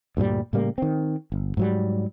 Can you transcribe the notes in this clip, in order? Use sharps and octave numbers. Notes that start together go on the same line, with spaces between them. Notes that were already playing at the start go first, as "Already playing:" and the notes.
D2 G2 A#2 G3
A2 C#3 G3 A#3
D#3 C4
G1
G#2 F#3 G3